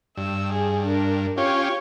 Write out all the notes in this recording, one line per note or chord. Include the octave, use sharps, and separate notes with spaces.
G2 E6
G#4
D4 A#4
C#4 F4 G4 C#5 C#6